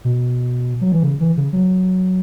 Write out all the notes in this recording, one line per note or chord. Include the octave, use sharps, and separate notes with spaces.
B2
F#3
E3
C#3
E3
C#3
F#3